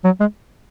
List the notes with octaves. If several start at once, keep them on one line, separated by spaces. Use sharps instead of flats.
F#3
G#3